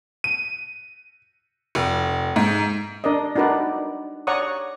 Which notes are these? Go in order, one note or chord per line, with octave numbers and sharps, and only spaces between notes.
D#7
F1
G#2
D4 A#4 D5 D#5
D4 D#4 F#4 A#4 B4 D5
C#5 D5 F#5 A#5 C#6 D#6